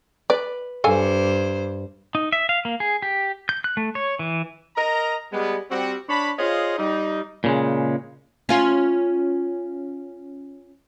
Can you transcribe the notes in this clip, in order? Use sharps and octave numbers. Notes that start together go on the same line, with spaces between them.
B4 D5
G2 A4 C5 F5 G#5
D#4
E5
F5
A#3
G#4
G4
G6
F#6
A3
C#5
E3
A#4 D#5 A#5
G3 G#3 B3
G3 C4 F#4
D4 C#5 A5 B5
F4 G#4 C5 C#5 D#5 F5
G3 D#4
A#2 C#3 G#3
C#4 F4